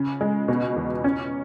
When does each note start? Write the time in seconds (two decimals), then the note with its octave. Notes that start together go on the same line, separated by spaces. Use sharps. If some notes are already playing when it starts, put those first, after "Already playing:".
Already playing: C#3
0.21 G#3
0.48 B2
0.76 E2
1.04 C#4